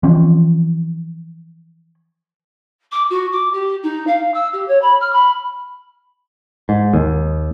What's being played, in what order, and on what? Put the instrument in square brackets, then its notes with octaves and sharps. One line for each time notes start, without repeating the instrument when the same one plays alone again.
[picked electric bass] E3 F3 C4 C#4
[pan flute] D6
F#4
D6
G4
D#4
F5
E6
G4
C#5
B5
F6
B5
[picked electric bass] G#2
D#2